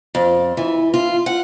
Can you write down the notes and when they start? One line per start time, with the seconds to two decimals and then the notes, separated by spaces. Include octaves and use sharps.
0.15 F2
0.57 E3
0.94 F4
1.26 F#5